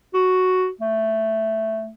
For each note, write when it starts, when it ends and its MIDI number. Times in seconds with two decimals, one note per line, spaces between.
0.14 0.68 66
0.81 1.92 57